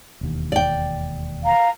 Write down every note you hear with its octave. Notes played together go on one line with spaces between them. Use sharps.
E1 D#2
D5 G5
F5 A#5